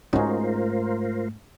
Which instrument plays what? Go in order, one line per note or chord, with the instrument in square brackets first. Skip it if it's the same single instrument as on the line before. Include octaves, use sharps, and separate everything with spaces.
[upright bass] G#2 A3 [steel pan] C#4 D#4 F#4 [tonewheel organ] F4 A#4 C5